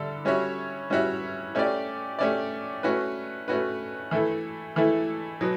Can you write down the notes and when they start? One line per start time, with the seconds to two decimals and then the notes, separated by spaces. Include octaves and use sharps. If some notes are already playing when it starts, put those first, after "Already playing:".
Already playing: D3 G3 D4 A4 E5
0.25 G3 C#4 F#4 C#5 E5
0.90 G3 C#4 F#4 C#5 E5
1.55 A3 C#4 G4 D5
2.19 A3 C#4 G4 D5
2.83 A3 C#4 F#4 B4
3.48 A3 C#4 F#4 B4
4.11 E3 A3 E4 A4
4.76 E3 A3 E4 A4
5.41 B2 F#3 B3